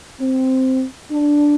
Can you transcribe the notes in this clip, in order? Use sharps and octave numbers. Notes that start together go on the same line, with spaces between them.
C4
D4